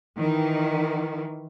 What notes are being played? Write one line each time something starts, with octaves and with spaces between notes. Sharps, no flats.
D#3 E3